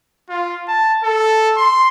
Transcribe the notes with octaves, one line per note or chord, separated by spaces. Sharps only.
F4
A5
A4
C6